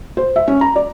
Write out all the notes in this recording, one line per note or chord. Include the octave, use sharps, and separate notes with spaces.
C5
E5
C#4
A#5
D5